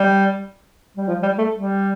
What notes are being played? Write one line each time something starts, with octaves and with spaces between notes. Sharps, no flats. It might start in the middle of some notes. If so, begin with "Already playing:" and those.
Already playing: G3
G3
F3
G3
A3
G3